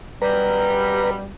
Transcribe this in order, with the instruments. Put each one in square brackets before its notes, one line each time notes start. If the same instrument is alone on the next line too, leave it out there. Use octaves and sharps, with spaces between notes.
[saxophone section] F#2 B2 G3 [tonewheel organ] B4 A#5